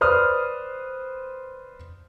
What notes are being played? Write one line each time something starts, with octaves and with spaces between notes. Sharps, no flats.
B4 C5 D5 D#6 F6